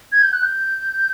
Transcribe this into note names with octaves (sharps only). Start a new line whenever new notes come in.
G#6
G6
F#6
G6